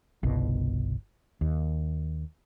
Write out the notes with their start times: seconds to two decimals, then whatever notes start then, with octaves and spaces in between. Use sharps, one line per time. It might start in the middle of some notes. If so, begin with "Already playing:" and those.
0.23 G1 C2 B2
1.41 D#2